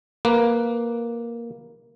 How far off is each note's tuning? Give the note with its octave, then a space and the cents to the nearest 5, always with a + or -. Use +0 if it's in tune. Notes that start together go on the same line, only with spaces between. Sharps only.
A#3 +5 B4 +0